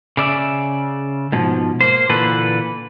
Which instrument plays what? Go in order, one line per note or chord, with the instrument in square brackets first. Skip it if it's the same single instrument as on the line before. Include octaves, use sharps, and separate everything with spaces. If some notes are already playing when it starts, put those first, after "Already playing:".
[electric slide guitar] C#3 D5 E5
G#2 B2 F3
A#3 C5
A#2 D3 E3 A4 B4